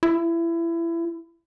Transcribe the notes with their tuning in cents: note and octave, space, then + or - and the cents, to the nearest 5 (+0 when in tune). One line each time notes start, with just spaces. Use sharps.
E4 +25